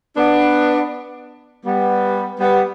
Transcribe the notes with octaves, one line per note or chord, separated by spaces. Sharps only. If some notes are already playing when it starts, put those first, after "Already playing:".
B3 D4
G3 B3
G3 B3